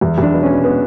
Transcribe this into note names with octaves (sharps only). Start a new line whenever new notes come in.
E2
E2 D4
B2
C#4
B2
B3